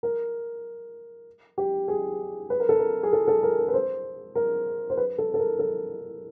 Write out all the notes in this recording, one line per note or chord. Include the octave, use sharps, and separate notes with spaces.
A#4
G4
G#4
B4
A#4
A4
A#4
G#4
A4
A4
A#4
A#4
B4
C5
A#4
C5
B4
A4
A4
A#4
A4